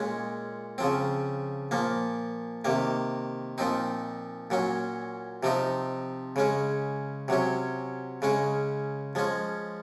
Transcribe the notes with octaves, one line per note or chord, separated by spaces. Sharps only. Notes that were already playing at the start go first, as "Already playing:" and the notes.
Already playing: A#2 G#3 C#4
C#3 F3 C4
A#2 F3 A#3
C3 D#3 A#3
A#2 F3 C4 D#4
A#2 F#3 C#4
C3 F3 C4 D#4
C#3 G#3 C#4
C3 F#3 C#4
C#3 G#3 C#4
F3 G#3 C#4